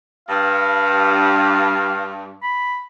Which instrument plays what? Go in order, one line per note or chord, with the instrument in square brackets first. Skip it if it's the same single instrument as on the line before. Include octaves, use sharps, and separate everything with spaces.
[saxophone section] G2 [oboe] F5
[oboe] B5